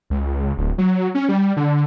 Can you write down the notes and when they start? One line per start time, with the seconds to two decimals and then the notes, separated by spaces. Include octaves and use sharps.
0.10 C#2
0.57 D1
0.78 F#3
1.15 C#4
1.29 G3
1.57 D3